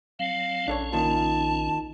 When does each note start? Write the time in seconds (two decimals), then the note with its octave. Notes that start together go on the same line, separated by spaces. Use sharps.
0.19 F#3 C4 F5
0.68 A#1 C#4 D4 A4 C#5
0.92 D#3 A#3 F4 A5